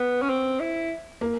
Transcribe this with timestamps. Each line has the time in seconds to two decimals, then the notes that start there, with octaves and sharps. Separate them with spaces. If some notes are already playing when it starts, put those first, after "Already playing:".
Already playing: B3
0.23 C#4
0.29 C4
0.60 E4
1.21 A#3